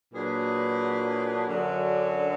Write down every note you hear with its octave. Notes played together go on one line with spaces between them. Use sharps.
A#2 F#3 D4 G#4 B4
F#2 D3 F#3